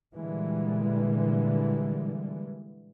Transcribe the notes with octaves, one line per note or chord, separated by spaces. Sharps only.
A#2 D3 E3 G3 G#3